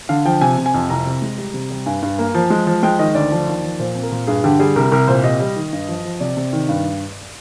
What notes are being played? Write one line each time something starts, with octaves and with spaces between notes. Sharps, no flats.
D3 F5
F3 G5
C3 G#5
C3
G#5
F2
C2 A#5
C3
G#3
G3
C3
G3
G2 G#5
G2
A#3
F3
G#3
F3
G#3 G5
D#3 D#5
D2 D5
F3
D#2
F3
A#2 C5
C4
A#4
A#2
G2 G#4
D3 G4
G3 G#4
C2 A#4
C2 A#4
A#2 C5
C3 D#5
G3
D#3
G2
F3
F3
C3 D5
C3
D#3
G2